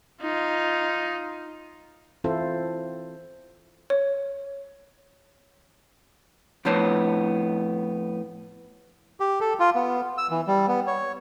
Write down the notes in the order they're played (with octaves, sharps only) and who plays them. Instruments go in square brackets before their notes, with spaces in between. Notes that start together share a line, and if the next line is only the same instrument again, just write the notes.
[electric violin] D#4 F4
[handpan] E3 C4 E4 F4 A4 C5
[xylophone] C#5
[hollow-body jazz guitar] F2 A2 B3 D4 C5 C#5
[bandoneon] G4
A4
F4
B3
E6
E3
G3
B3
C#5